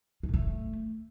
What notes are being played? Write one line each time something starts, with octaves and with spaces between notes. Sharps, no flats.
G#3
A2
A3